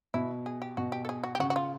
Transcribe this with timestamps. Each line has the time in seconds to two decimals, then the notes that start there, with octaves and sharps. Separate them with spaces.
0.14 B2 E4
0.46 G#4
0.62 G4
0.77 B2 F#4
0.92 G4
1.05 A4
1.09 G#4
1.24 F#4
1.35 G4
1.39 C#3 F#4
1.50 F#4
1.56 F4